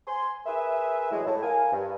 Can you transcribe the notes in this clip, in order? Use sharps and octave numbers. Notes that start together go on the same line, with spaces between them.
G#5 C6
G#4 A#4 B4 E5
A2 E3 F#3 G#3
A2
A#4 F5 G#5
G2